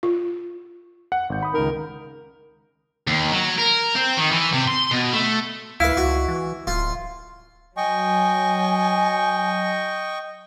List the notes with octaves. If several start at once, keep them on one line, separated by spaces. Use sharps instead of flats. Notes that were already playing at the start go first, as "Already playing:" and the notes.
F4
F#5
G#1 G6
B5 D#6
C#2 D#3 A#4
D#2
F#3
A#4
C4
D#3
E3
C3
C6
B2
A3
D2 E4 B4 F5
C#2 F#4
E3
D1 F4
F#3 D#5 G5 G#5 C#6